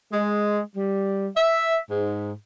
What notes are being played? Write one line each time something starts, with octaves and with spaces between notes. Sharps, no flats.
G#3
G3
E5
G#2